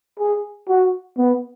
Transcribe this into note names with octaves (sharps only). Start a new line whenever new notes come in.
G#4
F#4
B3